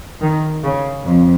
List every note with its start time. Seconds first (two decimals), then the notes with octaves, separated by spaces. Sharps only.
0.21 D#3
0.64 C#3
1.05 F2